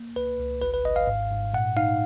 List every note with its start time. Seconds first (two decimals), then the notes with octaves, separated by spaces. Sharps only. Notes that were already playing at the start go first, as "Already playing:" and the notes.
Already playing: A#3
0.16 C#2 B4
0.40 C#2
0.61 G#1 B4
0.74 B4
0.85 G#1 D#5
0.96 F5
1.07 G#2
1.31 G#2
1.54 A#2 F#5
1.77 D#4 F5